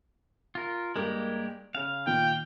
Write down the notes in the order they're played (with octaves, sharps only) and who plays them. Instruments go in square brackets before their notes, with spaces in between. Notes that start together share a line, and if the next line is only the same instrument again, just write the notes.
[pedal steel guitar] F4 A#4
[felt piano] G2 A#4 [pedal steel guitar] G#3 A#3 G4
[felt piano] C#3 C#4 [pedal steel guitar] F5
[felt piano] A#2 D#3 [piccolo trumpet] G5